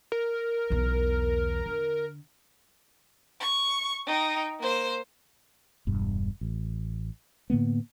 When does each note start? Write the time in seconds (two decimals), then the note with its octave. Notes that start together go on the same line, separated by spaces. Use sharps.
0.12 A#4
0.70 B1 E2
1.66 D3
3.40 C#6
4.06 D#4 G5
4.60 A#3 C5
5.87 E1 G2
6.41 A1
7.50 A2 D3 A#3 B3